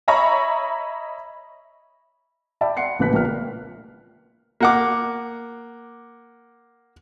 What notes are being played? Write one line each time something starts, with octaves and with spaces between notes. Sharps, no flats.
C#5 D#5 E5 A#5 B5 C#6
D5 E5 G5 A5 B5
F#5 C6 C7 C#7
A1 C#3 A#3 B4 F#6 B6
A#1 A#3 B3 A#4 F6
A#3 F#5 D6